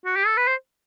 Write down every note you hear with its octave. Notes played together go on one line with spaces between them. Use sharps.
F#4
G4
A4
B4
C5